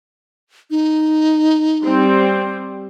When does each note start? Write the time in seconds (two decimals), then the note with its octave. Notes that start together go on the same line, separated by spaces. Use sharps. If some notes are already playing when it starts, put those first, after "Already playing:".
0.70 D#4
1.82 G3 C4